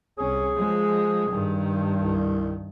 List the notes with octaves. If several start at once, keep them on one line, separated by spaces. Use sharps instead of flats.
C2 C#4 G#4
F3 G#3
G2 D#3
C2